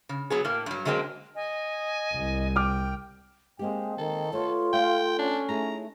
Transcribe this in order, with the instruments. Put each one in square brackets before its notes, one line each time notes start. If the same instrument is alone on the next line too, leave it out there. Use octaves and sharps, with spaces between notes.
[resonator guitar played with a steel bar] C#3
F#3 B3 G#4
A2 A#3
G2 F#3
D3 F#3 G#3 A#3 C4
[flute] D#5 [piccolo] G#5
[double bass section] C2
[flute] G5 [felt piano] D6 F6
[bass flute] G#3 [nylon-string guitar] A#3 C4 G4 [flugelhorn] G5
[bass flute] D#3 [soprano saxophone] A4
[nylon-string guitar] A3 B3 [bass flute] F4 [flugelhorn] C#5
[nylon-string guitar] A3 [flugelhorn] F5 [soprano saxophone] G5
[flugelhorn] C#4 [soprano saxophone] D4
[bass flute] A3 [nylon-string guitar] D#4 E4 G#4 [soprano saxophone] A#5